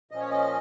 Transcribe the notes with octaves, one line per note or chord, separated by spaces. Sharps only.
A#2 F3 C#4 D#5
C#5
D#5